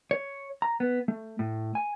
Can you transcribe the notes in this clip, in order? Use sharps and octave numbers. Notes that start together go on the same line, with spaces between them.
C#5
A#5
B3
A3
A2
G#5